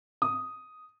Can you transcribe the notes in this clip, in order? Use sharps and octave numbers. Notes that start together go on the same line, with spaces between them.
D#6